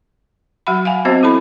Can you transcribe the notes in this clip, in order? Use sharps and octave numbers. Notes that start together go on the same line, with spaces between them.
F#3 F#4 E5 F#5 B5
F5 F#5 G#5
B3 C4 F#4 C5 D#5 E5
E4 A4 A5 B5